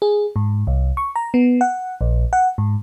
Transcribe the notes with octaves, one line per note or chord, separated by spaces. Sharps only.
G#4
G#2
C2
C#6
A#5
B3
F#5
A#1
F#5
G#2